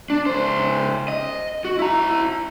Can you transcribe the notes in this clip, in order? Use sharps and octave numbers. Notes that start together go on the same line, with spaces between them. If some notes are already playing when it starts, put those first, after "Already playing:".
D4
C#2 C5
D#5
F#4
E4 A#5